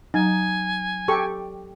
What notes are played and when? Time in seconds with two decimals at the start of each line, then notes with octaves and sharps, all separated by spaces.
0.14 F#3 D#4 G#5
1.08 G4 A4 C#6